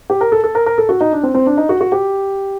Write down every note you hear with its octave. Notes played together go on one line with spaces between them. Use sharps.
G4
A#4
A4
A4
A#4
A#4
A4
F#4
D#4
D4
C4
C4
D4
D#4
F#4
F#4
G4